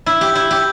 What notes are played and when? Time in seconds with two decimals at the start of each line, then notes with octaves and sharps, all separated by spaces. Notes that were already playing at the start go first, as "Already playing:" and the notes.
0.06 E4
0.21 G4
0.35 E4
0.51 G4